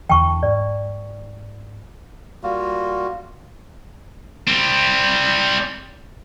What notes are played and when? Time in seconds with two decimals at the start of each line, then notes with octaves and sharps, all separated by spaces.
0.09 E2 D3 E3 G5 A5 C#6
0.43 G#2 D5
2.43 G3 A#3 F4 F#4
4.48 G3 C4